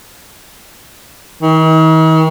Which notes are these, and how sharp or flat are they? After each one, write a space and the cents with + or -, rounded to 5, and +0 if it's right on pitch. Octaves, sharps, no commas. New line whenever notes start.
D#3 +45